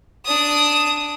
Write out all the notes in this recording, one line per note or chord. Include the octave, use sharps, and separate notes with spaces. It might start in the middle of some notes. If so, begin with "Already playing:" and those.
D4 D#6